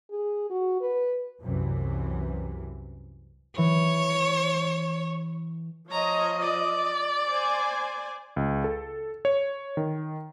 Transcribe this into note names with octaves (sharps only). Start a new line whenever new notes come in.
G#4
F#4
B4
C2 F#2 C3 E3
E3 C#5
F3 C#5 D#5 A#5
D5
C5 G#5
C#2
A4
C#5
D#3